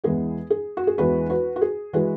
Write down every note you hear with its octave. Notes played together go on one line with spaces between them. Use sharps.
E2 E3 G#3 B3 G#4
G#4
F#4
G#4
E2 E3 G#3 B3 F#4 B4
F#4 B4
F#4
G#4
E3 G#3 F#4 B4